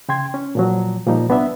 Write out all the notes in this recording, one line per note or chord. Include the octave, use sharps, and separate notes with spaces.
C#3 G5 C6 G#6
C#4
A#2 F3 F#3
A#2 F3 G3 A#3 D#4
C2 B3 D4 E5